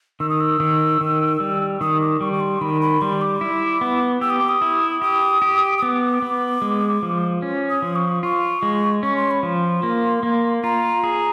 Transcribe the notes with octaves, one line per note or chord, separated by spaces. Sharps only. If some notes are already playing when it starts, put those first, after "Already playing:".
D#3 E6
D#6
E6
D#3
D#3
G3
D#3 D#6
D6
G3 C#6
C#6
C6
D#3 B5
B5
G3 C6
D6
E4
B3
G4 E6
D#6
D6
D#6
E4
G4 D#6
G4
D#6
B3 D6
B3
G#3
F3
C#4
D#6
F3
C#6
F4 C#6
G#3
C#4 C#6
C6
B5
F3 C6
A#3
A#3
F4 A#5
G#4